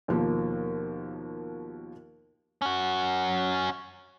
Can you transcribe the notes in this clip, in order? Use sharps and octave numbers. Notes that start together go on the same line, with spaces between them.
D#2 B2 F3 A#3
C#4 F#4